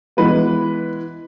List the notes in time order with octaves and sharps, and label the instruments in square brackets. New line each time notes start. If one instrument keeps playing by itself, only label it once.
[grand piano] E3 G#3 B3 B4